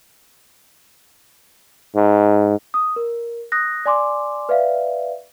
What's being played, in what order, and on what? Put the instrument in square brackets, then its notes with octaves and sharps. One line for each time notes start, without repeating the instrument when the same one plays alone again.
[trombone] G#2
[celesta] D#6
A#4
D#6 F#6 A#6
D5 G#5 C6 D6
B4 D5 E5 F5